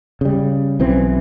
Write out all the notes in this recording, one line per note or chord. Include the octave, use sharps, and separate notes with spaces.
C#3 G3
B1 E3 C4